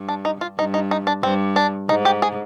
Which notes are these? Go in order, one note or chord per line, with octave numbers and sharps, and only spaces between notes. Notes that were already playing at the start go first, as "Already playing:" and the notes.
Already playing: G2
D4
D#4
F4
G2 D#4
D#4
D#4
D4
G2 C4
D4
G#2 D#4
G4
G#4